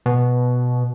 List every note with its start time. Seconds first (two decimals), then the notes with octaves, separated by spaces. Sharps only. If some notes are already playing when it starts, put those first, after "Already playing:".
0.06 B2